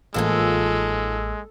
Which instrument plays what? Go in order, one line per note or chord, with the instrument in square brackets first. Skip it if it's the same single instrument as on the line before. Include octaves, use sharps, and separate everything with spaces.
[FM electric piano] A1 A#3 E6 [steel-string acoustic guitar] G#2 F3 F4 [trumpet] G#3 [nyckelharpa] A4